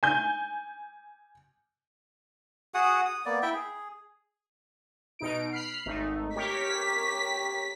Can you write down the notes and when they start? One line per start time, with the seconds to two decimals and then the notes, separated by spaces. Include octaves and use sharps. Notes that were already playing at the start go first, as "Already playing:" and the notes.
0.03 G#5 G6
2.74 F#4 G#4 F#5 D#6
3.05 D#6
3.26 A#3 B3 D5
3.42 E4 E5 G5
3.54 G#4
5.19 B2 D#4 D7
5.52 B5 F6 C7
5.86 G#1 A3 D#4
6.36 G4 A#4 C#5 B6